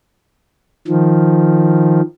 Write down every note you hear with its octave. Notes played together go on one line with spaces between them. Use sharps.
D#3 F3